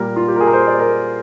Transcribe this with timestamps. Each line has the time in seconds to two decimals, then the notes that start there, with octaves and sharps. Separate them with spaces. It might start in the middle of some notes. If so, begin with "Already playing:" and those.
Already playing: A#2 G3 A#3 A#4
0.16 F4
0.28 G4
0.36 A#4
0.40 G#4
0.47 A#4
0.53 C5
0.67 D5
0.80 A#4